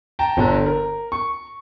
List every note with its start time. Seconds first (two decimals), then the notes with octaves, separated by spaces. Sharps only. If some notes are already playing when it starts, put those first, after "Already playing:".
0.19 G5 A5 A#5
0.37 G1 D3 A#5
0.66 A#4
1.12 C#6